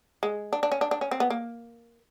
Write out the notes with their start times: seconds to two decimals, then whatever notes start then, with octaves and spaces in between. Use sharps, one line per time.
0.23 G#3
0.53 D4
0.63 D4
0.72 C#4
0.81 D4
0.91 D4
1.01 C#4
1.11 C4
1.20 B3
1.30 A#3